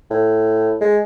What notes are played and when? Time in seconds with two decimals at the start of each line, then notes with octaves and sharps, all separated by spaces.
0.10 A2
0.81 G#3